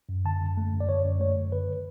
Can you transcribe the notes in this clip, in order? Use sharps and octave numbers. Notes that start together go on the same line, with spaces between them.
F#2
D3 A5
F#2
A3
F#2
D5
D3 C#5
F#2
A3 C#5
F#2
D3 B4